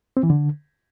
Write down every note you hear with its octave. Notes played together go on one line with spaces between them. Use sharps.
C4
E3
D3